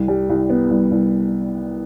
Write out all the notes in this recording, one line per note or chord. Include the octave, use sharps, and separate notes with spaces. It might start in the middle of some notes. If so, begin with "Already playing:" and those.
Already playing: C2
G3
C2
B3
C2
C2